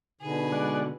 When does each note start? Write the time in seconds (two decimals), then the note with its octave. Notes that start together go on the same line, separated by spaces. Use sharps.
0.21 B2 D3 D#4 G#4 B4
0.52 G#3 D5 F#5